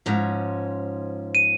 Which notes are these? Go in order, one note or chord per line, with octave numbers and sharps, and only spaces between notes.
G#2 F3 C#4
D#7